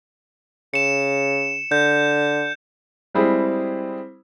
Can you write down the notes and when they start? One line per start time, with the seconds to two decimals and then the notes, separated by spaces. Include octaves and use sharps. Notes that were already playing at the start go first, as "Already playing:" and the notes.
0.74 C#3 C#7 E7
1.72 D3 G6
3.15 G3 G#3 C4 E4 G#4